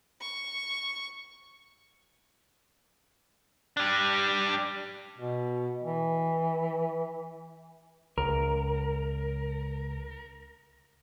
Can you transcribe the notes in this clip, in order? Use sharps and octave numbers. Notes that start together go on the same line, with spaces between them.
C#6
G3 D4
B2
E3
C#2 A#4